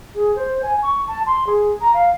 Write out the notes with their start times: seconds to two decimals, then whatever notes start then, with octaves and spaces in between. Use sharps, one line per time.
0.15 G#4
0.36 C5
0.63 G#5
0.83 C#6
1.08 A5
1.26 C6
1.47 G#4
1.81 A#5
1.94 F5